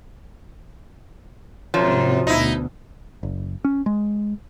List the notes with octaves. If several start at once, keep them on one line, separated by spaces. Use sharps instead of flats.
G#1 F#2 C3 F3
D2 B2 D#4 E4
F#1
C#4
G#3